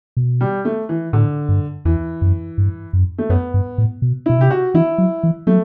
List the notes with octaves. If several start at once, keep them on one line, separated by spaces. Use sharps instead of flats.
B2
G3
A3
E3
A2 D3
G2
E2 E3
F#2
G2
F#2
A3
F#2 B3
G2
A2
B2
B2 E4
C3 G4
F#4
E3 E4
F#3
E3
F#3 A3